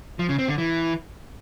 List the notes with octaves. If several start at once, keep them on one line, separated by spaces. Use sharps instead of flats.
F3
C#3
C4
D3
E3